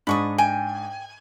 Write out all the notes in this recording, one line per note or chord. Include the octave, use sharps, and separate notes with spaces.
G#2 D4 B5 C#6 D#6
G5 G#5